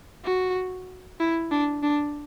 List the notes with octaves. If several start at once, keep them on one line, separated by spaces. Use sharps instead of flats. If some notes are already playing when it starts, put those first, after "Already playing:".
F#4
E4
D4
D4